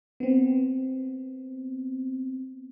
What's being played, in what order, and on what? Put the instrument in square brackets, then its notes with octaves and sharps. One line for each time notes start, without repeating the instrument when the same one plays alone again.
[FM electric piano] B3 C4